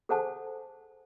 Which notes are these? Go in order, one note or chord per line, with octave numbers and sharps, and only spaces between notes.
G#4 A4 C5 F#5 G#5 A5